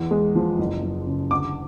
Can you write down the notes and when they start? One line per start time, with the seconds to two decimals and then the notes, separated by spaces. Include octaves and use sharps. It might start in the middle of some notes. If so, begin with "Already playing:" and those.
Already playing: E2
0.11 G#3
0.36 F3
0.59 F#1
0.83 F#1
1.07 C#3
1.31 D2 D6